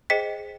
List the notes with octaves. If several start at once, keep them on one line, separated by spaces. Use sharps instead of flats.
G#4 C5 D#5 G5 B6 C#7